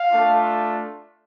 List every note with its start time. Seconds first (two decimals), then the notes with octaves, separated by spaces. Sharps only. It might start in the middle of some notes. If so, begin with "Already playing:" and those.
Already playing: F5
0.10 A3 D4 F4